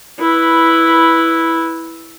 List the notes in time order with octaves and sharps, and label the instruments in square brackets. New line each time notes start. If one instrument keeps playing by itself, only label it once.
[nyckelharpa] E4 B4